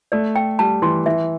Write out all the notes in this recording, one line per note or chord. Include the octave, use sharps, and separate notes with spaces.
A3 D5
G5
G3 A5
E3 C6
E3 E5